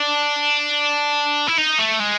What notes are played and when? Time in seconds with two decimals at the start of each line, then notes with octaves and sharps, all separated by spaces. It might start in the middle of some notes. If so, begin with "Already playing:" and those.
Already playing: D4
1.48 E4
1.57 D#4
1.78 A3
1.99 G#3